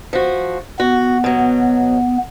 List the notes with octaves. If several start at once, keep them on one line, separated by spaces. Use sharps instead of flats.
F3 F#4
B3 F#4
B2 F#3